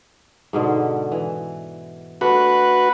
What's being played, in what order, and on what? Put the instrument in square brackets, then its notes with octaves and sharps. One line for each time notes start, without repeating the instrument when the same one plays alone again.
[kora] G#2 B2 D3
E3
[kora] A3 D4 [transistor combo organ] F#4 B4